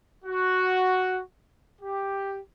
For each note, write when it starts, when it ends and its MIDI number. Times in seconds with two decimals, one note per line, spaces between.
0.25 1.20 66
1.81 2.39 67